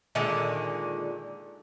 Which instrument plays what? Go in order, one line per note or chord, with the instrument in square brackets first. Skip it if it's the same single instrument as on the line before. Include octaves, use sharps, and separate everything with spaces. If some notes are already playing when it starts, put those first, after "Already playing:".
[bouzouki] A#2 D3 D#3 G#3